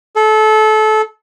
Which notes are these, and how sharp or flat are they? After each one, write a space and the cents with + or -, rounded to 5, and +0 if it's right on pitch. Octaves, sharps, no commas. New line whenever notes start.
A4 -25